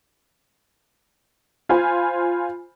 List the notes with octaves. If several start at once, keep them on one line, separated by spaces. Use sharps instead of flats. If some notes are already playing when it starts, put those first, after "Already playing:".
F4 C5 G#5 B5